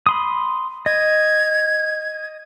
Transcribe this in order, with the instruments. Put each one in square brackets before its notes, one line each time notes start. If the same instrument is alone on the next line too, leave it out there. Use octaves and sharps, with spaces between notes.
[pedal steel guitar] B5 C6 D#6
[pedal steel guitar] D#5 [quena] G#6